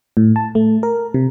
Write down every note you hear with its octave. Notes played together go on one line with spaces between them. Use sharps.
A2
A5
A3
A#4
C3